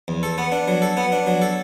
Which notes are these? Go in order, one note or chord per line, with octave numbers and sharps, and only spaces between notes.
E2
A4
B3
D4
F#3
A4
B3
D4
F#3
A4